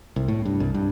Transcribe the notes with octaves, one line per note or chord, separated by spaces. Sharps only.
C2
A2
G2
C2
G2